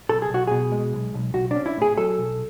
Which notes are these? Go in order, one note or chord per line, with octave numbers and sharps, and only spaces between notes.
B1 A4
G#4
B1 F#4
B2 G#4
G#3
B1
B1
B1 F#4
D4
C#4
E4
A2 G#4
F#3 A4
B1